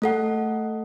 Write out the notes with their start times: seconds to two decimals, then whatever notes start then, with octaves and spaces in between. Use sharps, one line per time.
0.02 A3 A4 F#5